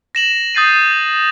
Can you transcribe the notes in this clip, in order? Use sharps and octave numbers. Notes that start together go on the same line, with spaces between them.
A#6 E7 F#7
D#6 G6 A6 C7 D#7